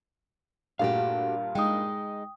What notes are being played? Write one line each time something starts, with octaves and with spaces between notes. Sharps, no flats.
G2 A#2 A3 F#4 G4 F5
G#3 D#4 G5 D#6